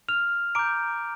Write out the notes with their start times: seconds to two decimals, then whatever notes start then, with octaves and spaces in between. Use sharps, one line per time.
0.09 F6 F7
0.55 A#5 D6 G6 D7